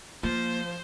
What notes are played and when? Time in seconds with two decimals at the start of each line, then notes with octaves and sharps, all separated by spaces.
0.23 F3 A#3 C5